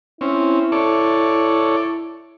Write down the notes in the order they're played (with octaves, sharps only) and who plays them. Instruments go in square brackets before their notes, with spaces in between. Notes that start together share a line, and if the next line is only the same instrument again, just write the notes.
[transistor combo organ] C4 C#4 [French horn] E4
[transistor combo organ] A4 C#5 D5